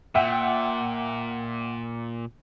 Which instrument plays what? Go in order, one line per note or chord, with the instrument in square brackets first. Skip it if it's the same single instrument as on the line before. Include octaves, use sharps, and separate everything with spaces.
[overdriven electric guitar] A#2 [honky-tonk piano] E5 F#5 G5